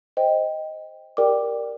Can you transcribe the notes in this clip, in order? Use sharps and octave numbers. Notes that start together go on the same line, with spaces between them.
C5 D#5 G5
G4 A#4 D5 G5 D6